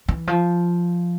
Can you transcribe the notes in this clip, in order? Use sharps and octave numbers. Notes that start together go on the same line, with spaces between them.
E3
F3